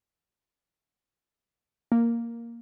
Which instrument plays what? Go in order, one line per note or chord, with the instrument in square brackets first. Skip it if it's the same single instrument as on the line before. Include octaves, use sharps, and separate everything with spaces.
[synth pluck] A#3